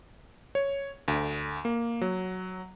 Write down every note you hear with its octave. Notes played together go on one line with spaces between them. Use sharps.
C#5
D2
A#3
F#3